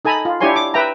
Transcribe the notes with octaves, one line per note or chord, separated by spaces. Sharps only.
D#4 A4 G#5 A#5 B5
F4
D4 E4 G4 C#5 G#5 C6
D6
B4 E5 G5 A#5